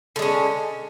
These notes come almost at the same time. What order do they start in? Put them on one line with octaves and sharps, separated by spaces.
D3 G#3 C#4